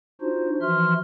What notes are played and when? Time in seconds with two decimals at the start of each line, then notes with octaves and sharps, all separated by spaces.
0.21 D4 D#4 F4 F#4 C5
0.62 E3 F3 F#4 E5 C6 F6